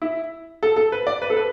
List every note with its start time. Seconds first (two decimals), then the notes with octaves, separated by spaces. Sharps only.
0.02 E4
0.63 A4
0.76 A4
0.92 B4
1.07 D5
1.22 B4
1.30 A4
1.37 B4